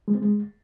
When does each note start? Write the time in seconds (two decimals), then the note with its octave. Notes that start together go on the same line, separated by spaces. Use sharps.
0.08 G#3
0.15 C4
0.22 G#3